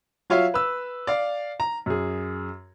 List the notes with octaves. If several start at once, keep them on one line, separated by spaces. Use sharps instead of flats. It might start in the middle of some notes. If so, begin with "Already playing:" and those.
F#3 F4 C#5 E5 F5
B4 E6
D5 F5
A#5
F#2 G#4